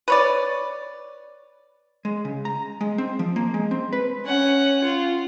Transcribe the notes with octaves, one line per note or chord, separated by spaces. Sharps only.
B4 C#5 D5
G#3
C#3
A#5
G#3
C4
F3
A#3
G#3
C4
B4
C#4 F#5
F4